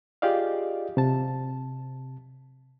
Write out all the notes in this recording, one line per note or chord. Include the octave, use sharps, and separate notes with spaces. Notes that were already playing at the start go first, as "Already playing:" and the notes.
F4 G4 G#4 D5 D#5 F5
C3 A5